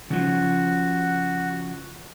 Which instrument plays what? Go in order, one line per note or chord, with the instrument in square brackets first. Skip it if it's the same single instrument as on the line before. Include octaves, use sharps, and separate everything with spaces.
[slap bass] C#3 F3 [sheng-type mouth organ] F#4